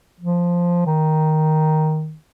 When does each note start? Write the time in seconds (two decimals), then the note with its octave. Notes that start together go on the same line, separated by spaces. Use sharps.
0.20 F3
0.86 D#3